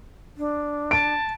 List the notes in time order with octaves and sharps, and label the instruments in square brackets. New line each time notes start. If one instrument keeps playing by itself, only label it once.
[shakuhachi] D4
[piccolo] A5 [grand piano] D7